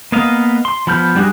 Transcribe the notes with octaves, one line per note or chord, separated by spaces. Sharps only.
A#3 B3 D#5 F5
C6
F3 B3 B5 F6 G6
G3 D4 F#4 G#4 F#6